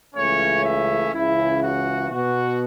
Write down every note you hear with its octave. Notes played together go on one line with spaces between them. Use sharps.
C#2 C#3 E3 A3 C#4 C#5
E5
C#2 C#3 E3 E4
F#4
B2 B3 F#4